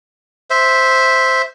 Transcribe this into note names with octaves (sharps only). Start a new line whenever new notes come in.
C5 E5